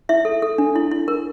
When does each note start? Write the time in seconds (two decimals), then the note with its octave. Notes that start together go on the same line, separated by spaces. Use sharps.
0.09 E4 E5
0.25 A4
0.42 A4
0.58 D4
0.76 E4
0.91 E4
1.08 A#4